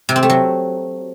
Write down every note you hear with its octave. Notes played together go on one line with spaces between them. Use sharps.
C3
C4
A3
F#3